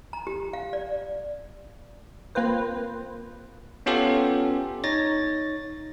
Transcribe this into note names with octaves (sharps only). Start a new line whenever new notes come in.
A#5
G4
F5
D5
A#3 C4 F4 B4 C5
B3 C#4 F4 G4 A4
D#4 C#5 A6 A#6